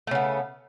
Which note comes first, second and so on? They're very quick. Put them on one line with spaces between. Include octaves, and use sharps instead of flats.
A3 C#3 B3